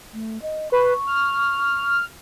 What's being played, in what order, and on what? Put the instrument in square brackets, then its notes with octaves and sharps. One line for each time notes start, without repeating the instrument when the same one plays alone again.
[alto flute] A3
D#5
[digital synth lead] B4 [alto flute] C#6
[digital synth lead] F6